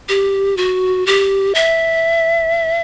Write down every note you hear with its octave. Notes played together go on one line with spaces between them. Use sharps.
G4
F#4
G4
E5